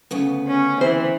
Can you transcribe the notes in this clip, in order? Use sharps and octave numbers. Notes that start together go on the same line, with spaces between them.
D2 C#3 B3
C#4
E3 C4 C5